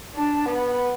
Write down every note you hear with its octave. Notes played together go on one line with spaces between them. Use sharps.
D4
B3